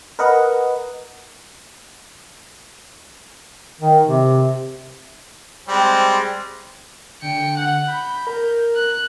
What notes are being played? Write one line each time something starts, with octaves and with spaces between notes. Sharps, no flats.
A#4 B4 D#5 F#5
D#3
C3
G3 G#3 C4
D3 G5 C#7
F#5
B5 G6
A#4
F#6